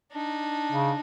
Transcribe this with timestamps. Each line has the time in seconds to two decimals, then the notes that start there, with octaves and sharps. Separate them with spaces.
0.12 D4 D#4
0.72 C#3